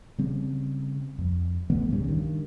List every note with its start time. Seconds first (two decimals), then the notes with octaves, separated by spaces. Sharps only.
0.18 C#3 G3 C4
1.19 F2
1.70 E3 G3 A3 B3
1.90 C2 G#2 C#3 G3
2.08 G2 D#3